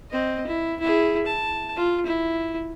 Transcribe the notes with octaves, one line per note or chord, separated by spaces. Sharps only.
C4 D#5
E4
E4 G#4
A5
F4
E4